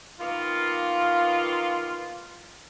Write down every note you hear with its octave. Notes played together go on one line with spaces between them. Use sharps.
D#3 A#3 B3 F4